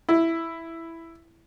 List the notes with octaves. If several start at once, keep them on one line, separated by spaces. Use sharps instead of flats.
E4